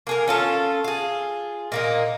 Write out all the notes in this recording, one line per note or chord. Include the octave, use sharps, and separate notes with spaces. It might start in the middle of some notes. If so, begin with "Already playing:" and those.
A#3 G#4 A#4
C#4 F4 A4
F4 G#4
A#2 A#3 D#4